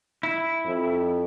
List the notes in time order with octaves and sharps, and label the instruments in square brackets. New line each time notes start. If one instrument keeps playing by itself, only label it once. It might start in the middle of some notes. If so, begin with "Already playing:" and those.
[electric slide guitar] E4
[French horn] F2